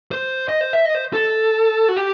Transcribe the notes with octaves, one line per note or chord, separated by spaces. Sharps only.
C5
D#5
C5
E5
D#5
C5
A4
F#4
G4